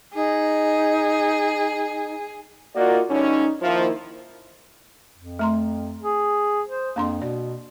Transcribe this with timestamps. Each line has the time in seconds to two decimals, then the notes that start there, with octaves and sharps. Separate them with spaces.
0.15 D#4 G#4
2.75 A#3 D#4 F4 F#4 A#4 D5
3.10 G2 D3 C#4 D#4
3.61 D#3 F3 A#3 E4
5.16 F2
5.39 A3 A#5 C6
6.02 G#4
6.68 C5
6.96 F2 A#3 D4 C6
7.22 B2 D5